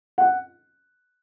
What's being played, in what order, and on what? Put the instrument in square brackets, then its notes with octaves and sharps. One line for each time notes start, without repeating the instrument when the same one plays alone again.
[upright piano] F#5